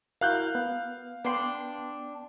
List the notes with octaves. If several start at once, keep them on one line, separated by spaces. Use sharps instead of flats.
E4 F#4 A#4 F5 F#6 G6
B3
B3 D4 G5 C6